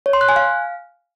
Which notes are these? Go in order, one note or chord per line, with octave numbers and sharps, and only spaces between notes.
C#5
C6
F#6
G#5
F5